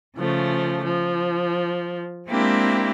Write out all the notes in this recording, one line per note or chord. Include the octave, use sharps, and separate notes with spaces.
C#3 F3 A3
F3
G#3 A#3 C4 D4 E4 G4